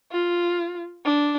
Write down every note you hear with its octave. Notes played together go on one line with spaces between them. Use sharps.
F4
D4